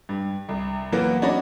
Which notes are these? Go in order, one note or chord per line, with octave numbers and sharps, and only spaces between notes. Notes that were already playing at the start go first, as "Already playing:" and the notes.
G2
C2
E3 F#3 A#3 B3 F#4
C#4 D4 F#4 C#5 D#5 B5